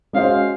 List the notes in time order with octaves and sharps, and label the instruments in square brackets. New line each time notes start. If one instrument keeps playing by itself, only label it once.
[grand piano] G#3 C#4 F#4 C5 D#5 [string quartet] F5